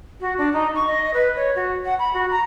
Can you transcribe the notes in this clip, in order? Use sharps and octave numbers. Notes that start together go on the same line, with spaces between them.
F#4
D4
D#4
C#6
D#5
B4
C#5
F#4
F#5
B5
F#4
A#5